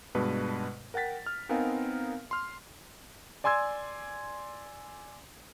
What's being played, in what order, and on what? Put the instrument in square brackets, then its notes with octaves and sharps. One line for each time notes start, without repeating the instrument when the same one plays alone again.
[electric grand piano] G2 B2 G#3 B4 A5
A#4 F#5 G5 A6 B6
F6
B3 C4 D#4 A#4 F5 G#5
C6 F6
D5 G#5 C6 E6 G#6